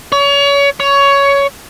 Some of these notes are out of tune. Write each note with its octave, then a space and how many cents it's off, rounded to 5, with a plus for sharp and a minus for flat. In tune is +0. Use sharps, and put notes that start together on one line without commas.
C#5 +30
C#5 +15